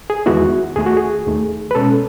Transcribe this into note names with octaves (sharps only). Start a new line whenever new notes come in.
G#4
E2 D#3 G#3 B3 E4 F#4
D#2 D#3 A3 G#4
F#4
G#4
D#2 D#3 A3
B4
B2 G#3 C#4 A4